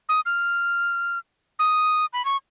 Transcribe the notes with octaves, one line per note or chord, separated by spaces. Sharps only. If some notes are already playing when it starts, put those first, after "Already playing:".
D#6
F6
D#6
B5
C#6